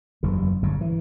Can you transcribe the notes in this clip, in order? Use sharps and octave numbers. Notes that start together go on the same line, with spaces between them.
F#1 E2 G2
G1 G2 C#3
E3